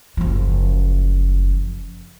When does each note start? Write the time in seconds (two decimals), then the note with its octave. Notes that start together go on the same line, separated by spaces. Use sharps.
0.17 F#1 F3